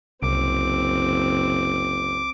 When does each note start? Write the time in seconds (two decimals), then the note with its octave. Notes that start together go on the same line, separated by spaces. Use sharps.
0.23 F#1 C2 C4 D6